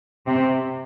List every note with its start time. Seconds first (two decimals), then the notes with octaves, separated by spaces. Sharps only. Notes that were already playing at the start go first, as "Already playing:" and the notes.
0.26 C3